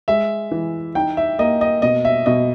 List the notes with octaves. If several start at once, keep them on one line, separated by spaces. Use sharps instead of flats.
G#3 E5
E3
D#4 G5
E5
A#3 D#5
D#5
B2 D#5
E5
B2 D#5